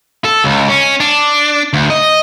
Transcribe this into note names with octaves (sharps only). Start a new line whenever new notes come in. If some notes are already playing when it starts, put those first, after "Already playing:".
A4
C#2
C#4
D4
D2
D#5